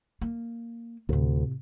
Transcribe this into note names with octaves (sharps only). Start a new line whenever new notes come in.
A#3
D2 A2 C3